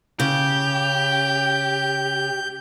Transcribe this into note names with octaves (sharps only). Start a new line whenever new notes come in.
C#3 G4 G6